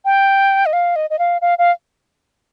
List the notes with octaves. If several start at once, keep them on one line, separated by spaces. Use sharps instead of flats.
G5
D#5
F5
D#5
D#5
F5
F5
F5